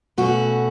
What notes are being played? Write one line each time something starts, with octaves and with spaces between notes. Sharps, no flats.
B2 A3 C#4 F#4